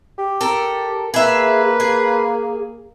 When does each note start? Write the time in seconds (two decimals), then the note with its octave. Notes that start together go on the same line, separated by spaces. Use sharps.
0.18 G4
0.41 A4 A#4
1.14 A#3 G#4 B4 E5
1.80 G#4